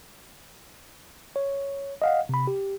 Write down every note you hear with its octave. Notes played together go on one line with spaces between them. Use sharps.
C#5
D#5 F5 F#5
C3 B5
G4